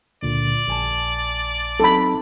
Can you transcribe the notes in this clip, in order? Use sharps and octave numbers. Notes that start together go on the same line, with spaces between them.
C#2 A#2 D3 D5
A#1 G#5 A5
F#3 C4 D#4 A4 B5